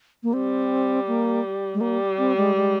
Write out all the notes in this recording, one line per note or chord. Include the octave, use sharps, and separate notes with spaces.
A#3
G3 C4
A#3
G#3
G3 A#3
C4
G#3
G#3